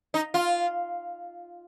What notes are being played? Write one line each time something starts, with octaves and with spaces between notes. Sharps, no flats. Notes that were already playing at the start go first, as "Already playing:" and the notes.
D#4
F4